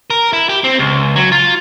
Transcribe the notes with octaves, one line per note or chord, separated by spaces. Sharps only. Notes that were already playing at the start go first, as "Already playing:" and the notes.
A#4
E4
G4
C4
C#2
F#3
F4